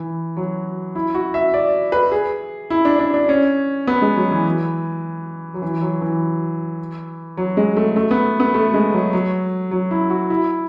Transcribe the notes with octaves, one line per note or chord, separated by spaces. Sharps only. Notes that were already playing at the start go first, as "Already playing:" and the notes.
Already playing: E3
F#3
E4
F#4
E5
D5
B4
G#4
E4
D4
D4
D4
C#4
B3
G#3
F#3
E3
F#3
E3
F#3
E3
F#3
G#3
A3
A3
B3
B3
A3
G#3
F#3
F#3
F#3
E4
F#4
E4